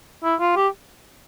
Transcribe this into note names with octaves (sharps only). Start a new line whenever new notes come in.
E4
F4
G4